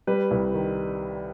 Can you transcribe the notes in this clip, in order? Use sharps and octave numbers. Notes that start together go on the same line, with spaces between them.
G3 B4
C2
D#3